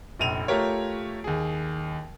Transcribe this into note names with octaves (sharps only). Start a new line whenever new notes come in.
F1 A#1 D#7 F7
A3 F4 G4 A#4 C#5
D#2 G#4